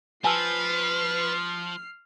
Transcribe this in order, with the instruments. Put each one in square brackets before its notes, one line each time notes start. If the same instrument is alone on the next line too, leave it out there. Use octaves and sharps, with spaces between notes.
[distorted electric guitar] F3 [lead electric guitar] B4 [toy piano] G#5 A5 E6 [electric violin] F6 C7